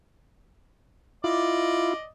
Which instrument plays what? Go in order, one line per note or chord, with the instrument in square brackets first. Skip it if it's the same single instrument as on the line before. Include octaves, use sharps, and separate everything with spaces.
[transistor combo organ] E4 F4 [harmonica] D5 D#5